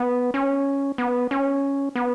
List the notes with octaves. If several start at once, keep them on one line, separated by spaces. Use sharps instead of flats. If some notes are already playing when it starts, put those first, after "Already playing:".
Already playing: B3
C#4
B3
C#4
B3